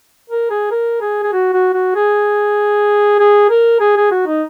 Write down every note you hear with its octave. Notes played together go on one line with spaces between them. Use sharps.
A#4
G#4
A#4
G#4
G#4
F#4
F#4
F#4
G#4
G#4
A#4
G#4
G#4
F#4
D#4